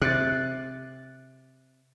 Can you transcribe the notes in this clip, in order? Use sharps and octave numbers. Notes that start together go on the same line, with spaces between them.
C3 F#6 A6